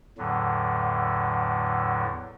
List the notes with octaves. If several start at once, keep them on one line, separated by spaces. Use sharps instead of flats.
E2 A2 D3 F#3